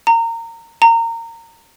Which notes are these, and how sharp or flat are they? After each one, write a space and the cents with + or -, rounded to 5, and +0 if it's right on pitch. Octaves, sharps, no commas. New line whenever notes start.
A#5 -25
A#5 -25